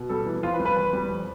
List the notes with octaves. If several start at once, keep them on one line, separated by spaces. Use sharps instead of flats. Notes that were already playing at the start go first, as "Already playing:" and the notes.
Already playing: B2
G3 A4
E3
F2 F4
B4
G3
B4
E2
G3
F2